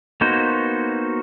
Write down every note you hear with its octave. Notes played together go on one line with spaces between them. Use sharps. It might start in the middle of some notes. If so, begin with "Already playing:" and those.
A#3 B3 D#4 F#4 C5